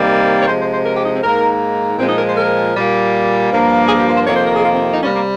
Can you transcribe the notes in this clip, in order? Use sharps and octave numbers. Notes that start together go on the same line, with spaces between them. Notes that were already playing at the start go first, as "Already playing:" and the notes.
Already playing: C3 D#3 G3 A#3
C#5
C3 F3 G#3 C5
C5
C5
A#4
G4
D#4
C4
G#2 D#3 A#3 A#4
A#2 F3 G#3 C4
D#4
A#4
C5
A#4
A#2 G3 A#3
G2 F3 A#3
G#4
G4
F4
C5
F2 C3 D#3 A#3 C#5
C5
A#4
G#4
F4
C4
D#4
C3 G3 A#3 C#4
A#3